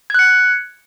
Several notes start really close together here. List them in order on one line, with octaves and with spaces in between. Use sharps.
G#6 F#6 C#7